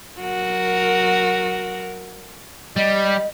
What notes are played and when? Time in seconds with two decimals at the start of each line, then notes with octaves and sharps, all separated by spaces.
0.20 F#3 F#4 A#4
2.76 G3 D#5